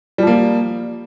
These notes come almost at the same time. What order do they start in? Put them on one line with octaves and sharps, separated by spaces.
G3 F3 A#3